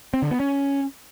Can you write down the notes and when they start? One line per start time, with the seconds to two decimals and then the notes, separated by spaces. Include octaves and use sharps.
0.14 C4
0.22 D3
0.31 B3
0.40 C#4